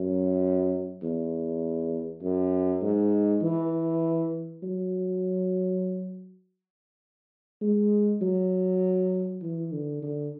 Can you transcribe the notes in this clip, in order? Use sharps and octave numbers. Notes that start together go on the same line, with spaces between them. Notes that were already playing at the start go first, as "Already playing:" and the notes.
Already playing: F#2
E2
F#2
G#2
E3
F#3
G#3
F#3
E3
D3
D3